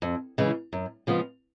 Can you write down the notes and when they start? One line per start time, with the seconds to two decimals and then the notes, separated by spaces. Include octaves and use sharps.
0.02 F2
0.38 C#3 E3 G#3
0.73 F#2
1.07 C#3 F3 G#3 B3